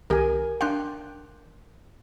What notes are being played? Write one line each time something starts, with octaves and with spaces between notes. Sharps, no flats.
C2 D#3 G4 A#4 G#5
D4 F5 G5 C6 F#6